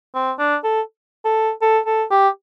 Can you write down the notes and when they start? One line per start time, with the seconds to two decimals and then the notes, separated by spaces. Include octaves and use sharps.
0.14 C4
0.39 D4
0.64 A4
1.25 A4
1.62 A4
1.86 A4
2.11 G4